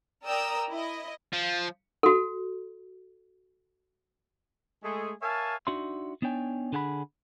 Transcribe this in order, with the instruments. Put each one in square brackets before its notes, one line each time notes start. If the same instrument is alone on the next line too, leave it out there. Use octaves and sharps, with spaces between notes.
[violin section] A#4 D5 G5 A#5 D#6 E6
E4 D#5
[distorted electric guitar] F3
[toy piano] F#4 A4
[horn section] G#3 A3 G#4
A#4 C#5 E5 F5 G#5 A5
[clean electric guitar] D4 D#4 F#4 D5 E5 C6
B3 D4 D#4 C#5 G5 G#5
D3 D4 G#4 F#5 G5 B5